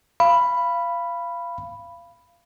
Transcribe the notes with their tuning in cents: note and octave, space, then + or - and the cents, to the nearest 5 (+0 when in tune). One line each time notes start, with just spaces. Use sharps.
F5 -25 B5 +0